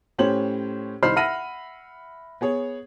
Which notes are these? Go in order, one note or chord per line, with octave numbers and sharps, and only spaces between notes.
A2 C#4 G4 C5 C#5 F#7
C2 D#4 C5 B5 F6 C7
E5 F#5 B5 F6 A#6 D#7
B3 G#4 C#5